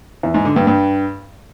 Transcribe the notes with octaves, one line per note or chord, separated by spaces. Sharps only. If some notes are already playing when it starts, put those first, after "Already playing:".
E2
G#2
D3
G2
G2